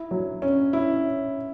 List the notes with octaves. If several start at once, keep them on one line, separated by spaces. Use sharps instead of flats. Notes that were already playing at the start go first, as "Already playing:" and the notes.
Already playing: E4
F#3
C#4
E4